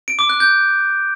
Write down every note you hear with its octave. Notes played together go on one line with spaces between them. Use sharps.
D7
D6
F#6
G6